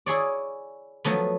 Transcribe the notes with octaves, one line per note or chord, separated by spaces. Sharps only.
E4 G#4 C#5 D5
F3 F#3 A3 B3